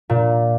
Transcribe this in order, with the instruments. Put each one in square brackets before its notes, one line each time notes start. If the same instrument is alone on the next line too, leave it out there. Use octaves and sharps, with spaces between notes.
[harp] A#2